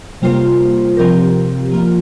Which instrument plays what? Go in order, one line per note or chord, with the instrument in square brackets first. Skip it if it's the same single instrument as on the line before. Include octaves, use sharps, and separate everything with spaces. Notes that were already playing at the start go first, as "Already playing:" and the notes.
[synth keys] C3 G3 A#3 F4 C5
C3 F3 C4 G4 A#4
F3 A#3 F4